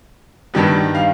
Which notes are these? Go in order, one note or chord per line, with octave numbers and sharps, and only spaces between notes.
G2 D#3 G3 B3
F5